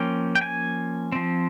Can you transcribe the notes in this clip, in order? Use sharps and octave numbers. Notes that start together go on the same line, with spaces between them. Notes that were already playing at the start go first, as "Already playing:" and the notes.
Already playing: F3 A#3 C#4 G5
G5
G#5
F3 C4